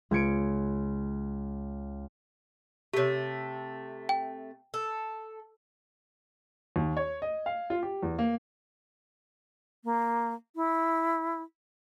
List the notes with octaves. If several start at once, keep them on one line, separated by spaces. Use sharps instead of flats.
C#2 G#6 C#7 D7
C3 A3 G4 C#5
G5
A4
D#2
C#5
D#5
F5
F4
G4
E2
A#3
A#3
E4